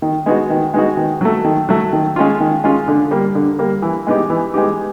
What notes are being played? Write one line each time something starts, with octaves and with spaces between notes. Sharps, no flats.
D#3
G#3 B3 D#4 F#4
D#3
G#3 B3 D#4 F#4
D#3
F#3 A3
D#3
F#3 A3
D#3
G#3 C#4 F4
D#3
G#3 C#4 F4
D3
G3 A#3
D3
G3 A#3
E3
G#3 B3 D#4 G4
E3
G#3 B3 D#4 G4